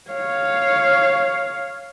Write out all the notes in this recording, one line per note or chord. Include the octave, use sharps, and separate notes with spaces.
C#5 F5